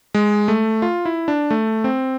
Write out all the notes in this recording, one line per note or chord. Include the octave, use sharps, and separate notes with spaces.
G#3
A3
F4
E4
D4
A3
C4